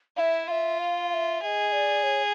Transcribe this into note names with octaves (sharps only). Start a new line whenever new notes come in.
E4 E5 F5
F4 E5 F5
F5
F5
E5
G#4 D#5 E5
D5
C#5